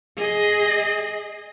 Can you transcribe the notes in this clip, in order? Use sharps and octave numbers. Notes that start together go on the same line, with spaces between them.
G#4 D#5